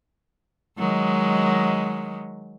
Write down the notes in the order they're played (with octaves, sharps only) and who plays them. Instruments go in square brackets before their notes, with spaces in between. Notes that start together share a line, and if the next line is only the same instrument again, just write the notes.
[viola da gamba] D#3 F#3 G#3